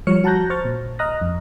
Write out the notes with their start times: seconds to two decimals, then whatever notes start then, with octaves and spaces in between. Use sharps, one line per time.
0.07 F3 G3 C#5 F6 C#7
0.24 F#4 A5 A#5 F#6 G6 A#6
0.50 C5 C#6 F6 A6
0.65 A#2
0.99 D#5 A#5 D#6 F6 F#6 A#6
1.21 F2